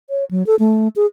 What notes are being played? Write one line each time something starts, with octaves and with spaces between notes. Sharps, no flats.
C#5
F#3
A4
A3
G#4